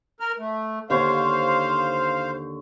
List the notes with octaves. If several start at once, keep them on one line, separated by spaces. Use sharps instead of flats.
A#4 F6
A3
D#2 D3 C5 C#5 F5